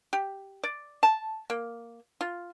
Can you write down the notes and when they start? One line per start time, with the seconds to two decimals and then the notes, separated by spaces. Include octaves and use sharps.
0.13 G4
0.64 D5
1.03 A5
1.50 A#3
2.21 F4